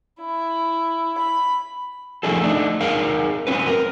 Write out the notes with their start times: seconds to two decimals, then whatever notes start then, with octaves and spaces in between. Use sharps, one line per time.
0.21 E4
1.19 B5
2.23 F3 A3 A#3 D#4 G#4 A4
2.42 A3 D4 D#4
2.81 D#4 G#4 A#4 F5
3.47 F#3 C4 C#4 B4
3.67 A#4